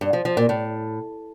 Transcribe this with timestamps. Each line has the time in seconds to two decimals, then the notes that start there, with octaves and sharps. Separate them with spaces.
0.01 G2
0.13 F3
0.25 F3
0.37 A#2
0.49 A2